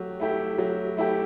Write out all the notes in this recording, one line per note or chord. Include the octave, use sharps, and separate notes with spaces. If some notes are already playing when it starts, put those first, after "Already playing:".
Already playing: F#3 A3 G4
A3 E4 G4
F#3
A3 E4 G4